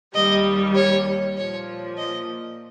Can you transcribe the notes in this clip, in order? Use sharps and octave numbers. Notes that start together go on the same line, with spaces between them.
D#2 D#3 G3 D#5
C#5
A#2 F3 C#5
D#5